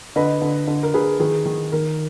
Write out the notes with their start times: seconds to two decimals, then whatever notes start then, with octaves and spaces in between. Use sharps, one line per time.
0.16 D3 B4 D#5
0.42 D3
0.68 D3
0.83 A#4
0.94 D3 G#4 B4
1.20 D#3 G#4
1.46 D#3
1.72 D#3 A#4